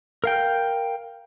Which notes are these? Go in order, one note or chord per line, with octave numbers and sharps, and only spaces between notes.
A#4 F5 G5